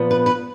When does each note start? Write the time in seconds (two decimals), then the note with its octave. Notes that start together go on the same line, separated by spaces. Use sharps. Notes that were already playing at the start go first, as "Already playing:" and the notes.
Already playing: A#2 F3 B3
0.11 B4
0.26 B4